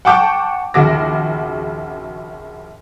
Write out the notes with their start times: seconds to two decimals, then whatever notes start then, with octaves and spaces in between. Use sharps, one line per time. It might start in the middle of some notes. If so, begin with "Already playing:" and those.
0.05 F#5 G5 A5 C#6 D6 G6
0.74 A#1 D#2 C#3 F#4 D6 A#6